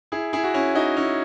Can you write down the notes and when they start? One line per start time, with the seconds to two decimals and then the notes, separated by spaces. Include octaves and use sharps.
0.12 E4 G#4
0.33 E4 G#4
0.44 F#4
0.54 C#4 E4
0.75 D#4 F#4
0.97 C#4 E4